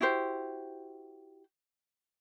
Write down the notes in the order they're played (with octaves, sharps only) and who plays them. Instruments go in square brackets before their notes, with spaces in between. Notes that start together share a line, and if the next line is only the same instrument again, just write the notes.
[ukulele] E4 F#4 G4 C5